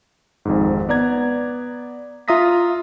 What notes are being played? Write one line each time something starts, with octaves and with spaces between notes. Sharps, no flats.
G#1 F2 G#2
B3 D5 A#5 G#6
F4 E5 A#5 D#6 A#6 B6